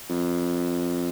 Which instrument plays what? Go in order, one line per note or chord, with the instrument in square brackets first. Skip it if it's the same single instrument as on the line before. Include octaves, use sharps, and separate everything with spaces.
[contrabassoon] F2